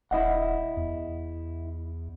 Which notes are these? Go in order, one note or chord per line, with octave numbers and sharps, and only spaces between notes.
D#1 E4 D#5 F#5
E2